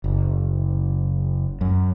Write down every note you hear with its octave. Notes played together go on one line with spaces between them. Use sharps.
F#1
F#2